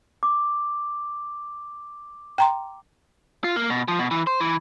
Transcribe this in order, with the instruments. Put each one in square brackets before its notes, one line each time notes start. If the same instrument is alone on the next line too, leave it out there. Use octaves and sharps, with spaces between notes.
[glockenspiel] D6
[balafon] G5 A#5 C6
[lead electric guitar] F4
A#3
B2
F3
B2
E3
C5
E3